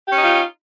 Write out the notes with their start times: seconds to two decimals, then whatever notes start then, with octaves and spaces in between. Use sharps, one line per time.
0.08 G4
0.12 C#4
0.17 D#4
0.22 F4